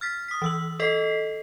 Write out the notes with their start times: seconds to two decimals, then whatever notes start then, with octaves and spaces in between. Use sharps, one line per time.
0.01 F6 A6 B6
0.28 D#6 B6
0.42 E3 E6 F#7
0.80 A4 D#5 B6 C7